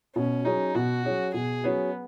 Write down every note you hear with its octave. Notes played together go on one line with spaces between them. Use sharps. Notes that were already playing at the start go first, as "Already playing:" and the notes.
B2 C#4
F#3 C#4 D#4 G#4
B2 F#4
F#3 C#4 G#4
B2 G#4
F#3 B3 C#4 G#4